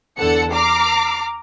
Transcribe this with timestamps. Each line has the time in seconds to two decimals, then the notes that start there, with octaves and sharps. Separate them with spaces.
0.18 E2 D3 A4 F#5 C#7
0.53 A#5 D6 F6 C7